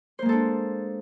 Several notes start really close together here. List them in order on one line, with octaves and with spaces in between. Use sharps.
C5 A#3 G#3 A4 D4